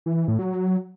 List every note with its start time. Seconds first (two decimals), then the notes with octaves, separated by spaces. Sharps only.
0.06 E3
0.17 E3
0.28 A2
0.39 F#3